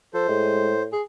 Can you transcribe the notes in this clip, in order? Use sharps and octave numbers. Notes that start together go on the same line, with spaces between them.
F3 A4 C5
A2 G#3
G#4